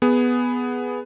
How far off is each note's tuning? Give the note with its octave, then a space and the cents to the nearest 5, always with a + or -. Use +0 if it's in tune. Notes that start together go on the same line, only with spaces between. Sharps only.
B3 +0 G#4 +0